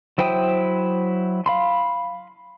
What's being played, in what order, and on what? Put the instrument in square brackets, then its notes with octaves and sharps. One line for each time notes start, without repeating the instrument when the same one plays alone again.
[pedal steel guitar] F#3 E4 C5 G5 D#6
F5 B5 C6